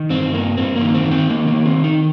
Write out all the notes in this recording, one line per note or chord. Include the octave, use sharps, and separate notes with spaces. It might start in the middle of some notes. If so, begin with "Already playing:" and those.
Already playing: D#3
G2 C4
G2 A#3
G2 C4
A#3
D#3
C4
D#3
C4
D#3 A#3
A#3
D#3
C4
D#3
D#4